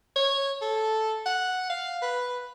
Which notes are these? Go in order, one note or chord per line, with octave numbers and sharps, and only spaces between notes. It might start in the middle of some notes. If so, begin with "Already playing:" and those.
C#5
A4
F#5
F5
B4